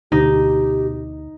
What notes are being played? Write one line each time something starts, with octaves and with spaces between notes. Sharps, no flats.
D2 B2 D#4 G4